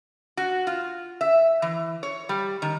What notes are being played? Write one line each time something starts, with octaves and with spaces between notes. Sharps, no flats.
F#4
F4
E5
E3
C#5
G3
D#3